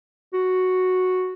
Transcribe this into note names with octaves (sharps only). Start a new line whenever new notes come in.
F#4